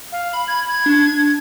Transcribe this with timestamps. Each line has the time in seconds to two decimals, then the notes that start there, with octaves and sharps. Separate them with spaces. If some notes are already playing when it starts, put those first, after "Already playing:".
0.12 F5
0.33 B5
0.48 G#6
0.69 G#6
0.86 D4